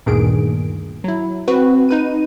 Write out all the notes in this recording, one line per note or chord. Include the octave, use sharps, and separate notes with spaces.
D2 G2 A#2 D#3 G#4 D7
F#3 E4
C4 F#4 B4
D#4 B4 D#7